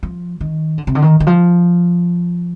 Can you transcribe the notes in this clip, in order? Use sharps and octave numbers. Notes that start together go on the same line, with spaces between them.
F3
D#3
D3
C3
D3
D#3
D#3
F3